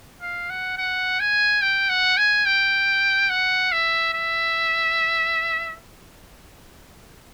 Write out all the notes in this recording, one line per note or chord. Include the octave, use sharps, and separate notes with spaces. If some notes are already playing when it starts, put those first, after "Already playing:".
F5
F#5
F#5
G#5
G5
F#5
G#5
G5
F#5
E5
E5